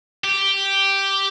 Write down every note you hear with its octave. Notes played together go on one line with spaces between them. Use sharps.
G4